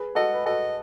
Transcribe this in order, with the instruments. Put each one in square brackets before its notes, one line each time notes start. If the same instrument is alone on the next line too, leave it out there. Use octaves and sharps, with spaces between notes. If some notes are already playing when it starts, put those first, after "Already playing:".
Already playing: [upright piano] G#4 B4
[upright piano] F#4 A4 [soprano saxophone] D#5
[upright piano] B4
[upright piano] F#4 A4 [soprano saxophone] D#5